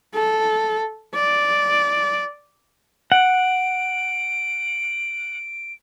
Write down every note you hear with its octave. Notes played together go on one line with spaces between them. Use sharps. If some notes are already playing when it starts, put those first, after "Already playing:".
A4
D5
F#5 D7